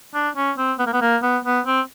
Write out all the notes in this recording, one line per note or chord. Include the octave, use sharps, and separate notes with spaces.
D4
C#4
C4
B3
A#3
B3
A#3
B3
B3
C4